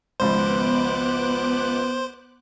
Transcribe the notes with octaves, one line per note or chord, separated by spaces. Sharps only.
G#1 C#2 F3 B3 C5 D6 F#6